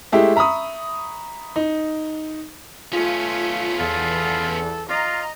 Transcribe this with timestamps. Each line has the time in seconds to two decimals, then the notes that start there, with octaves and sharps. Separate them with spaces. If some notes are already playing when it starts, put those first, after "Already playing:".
0.12 G#3 A3 E4 G4 E5
0.36 E5 A#5 B5 C#6 D#6
1.56 D#4
2.93 A3 B3 C#4 F4
3.79 E2 F4 A4
4.89 F4 D#5 A#5